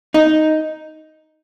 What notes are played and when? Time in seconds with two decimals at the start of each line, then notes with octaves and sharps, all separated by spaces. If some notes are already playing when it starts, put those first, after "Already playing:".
0.14 D#4